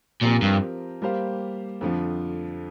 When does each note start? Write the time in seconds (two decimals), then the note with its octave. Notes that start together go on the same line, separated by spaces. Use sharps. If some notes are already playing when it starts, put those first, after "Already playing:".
0.22 A#2 F3 C4 G4 A#4
0.42 G2
1.02 G3 A#3 G4 C5 F5
1.81 F2 D3 F3